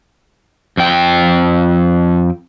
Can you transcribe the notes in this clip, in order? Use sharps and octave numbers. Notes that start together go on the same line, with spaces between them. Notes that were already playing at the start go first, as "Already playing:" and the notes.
F2 G5